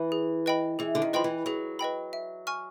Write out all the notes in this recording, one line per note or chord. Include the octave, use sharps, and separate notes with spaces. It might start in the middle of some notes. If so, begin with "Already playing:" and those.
Already playing: E3
G#4
B4 D#5 G5 B5
E3 G#4
D3
D#3
F3 B4 D#5 G5 B5
E3
F#3 G#4
B4 D#5 G5 B5
E5
G#5 C#6 F6